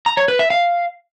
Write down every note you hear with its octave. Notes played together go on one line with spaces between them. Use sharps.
A#5
C#5
B4
E5
F5